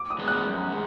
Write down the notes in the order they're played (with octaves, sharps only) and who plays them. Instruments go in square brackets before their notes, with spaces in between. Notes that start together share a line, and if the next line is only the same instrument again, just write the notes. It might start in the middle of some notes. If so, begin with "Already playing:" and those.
Already playing: [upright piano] D6
D#6
[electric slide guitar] D#3 G#3 B3 D4
[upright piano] F#6
[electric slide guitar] F#2
D#3 G#3